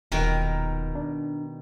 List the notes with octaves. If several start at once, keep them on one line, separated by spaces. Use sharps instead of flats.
D#1 B2 D#3 A#4
D4